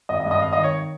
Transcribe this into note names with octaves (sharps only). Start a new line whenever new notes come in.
G#1 D#5
D#5
G2
D#5
G#1 F5
D#5
D#3
C#5